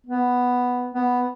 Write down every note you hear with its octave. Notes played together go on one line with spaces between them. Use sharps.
B3
B3